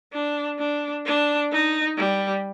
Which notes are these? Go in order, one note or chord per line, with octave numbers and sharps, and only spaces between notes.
D4
D4
D4
D#4
G3